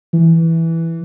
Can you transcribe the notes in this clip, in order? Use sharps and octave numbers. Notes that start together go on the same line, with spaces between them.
E3